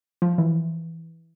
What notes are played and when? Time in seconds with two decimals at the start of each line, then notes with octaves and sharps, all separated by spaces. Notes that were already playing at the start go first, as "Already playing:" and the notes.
0.22 F3
0.38 E3